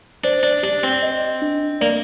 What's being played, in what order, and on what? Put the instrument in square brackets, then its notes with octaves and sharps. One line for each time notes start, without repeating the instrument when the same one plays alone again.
[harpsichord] D4 [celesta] C5
[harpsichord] D4
[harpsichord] D4 [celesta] G4
[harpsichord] C4
[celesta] D#5
D4
[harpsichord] A#3 [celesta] D5